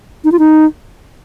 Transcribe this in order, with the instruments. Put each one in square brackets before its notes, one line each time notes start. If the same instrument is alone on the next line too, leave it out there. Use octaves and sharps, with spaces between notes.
[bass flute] D#4
F4
D#4